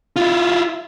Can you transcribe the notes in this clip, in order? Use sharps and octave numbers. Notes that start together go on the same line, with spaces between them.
E4 F4